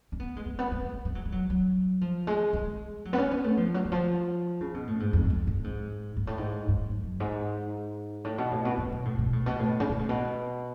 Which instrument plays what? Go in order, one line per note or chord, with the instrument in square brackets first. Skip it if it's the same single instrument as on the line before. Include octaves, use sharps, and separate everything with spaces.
[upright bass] C#4
B3
G#3
A3
B3
G#3
G#3
G#3
F#3
G#3
F#3
F#3
F3
G#3
G#3
F#3
B3
C#4
B3
A3
F3
F#3
D3
F3
C#3
B2
A2
G#2
F2
F2
A2
G#2
G#2
A2
G#2
G#2
F#2
F#2
G#2
A2
B2
A2
B2
A2
B2
A2
B2
A2
B2
A2
C#3
B2
A2
B2